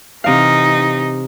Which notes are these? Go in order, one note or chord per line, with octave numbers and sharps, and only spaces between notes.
C3 E3 D#4 F5